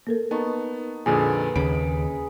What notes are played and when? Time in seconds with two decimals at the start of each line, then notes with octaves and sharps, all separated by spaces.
0.07 A#3 A4 A#4
0.31 B3 D#4 A5 C#6
1.06 F2 A#2 D3 G#4 B4
1.56 D#2 C#3 B5 D#6 D7